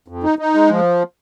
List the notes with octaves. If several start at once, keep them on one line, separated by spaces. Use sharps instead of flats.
F2
D#4
D#4
G#3
F3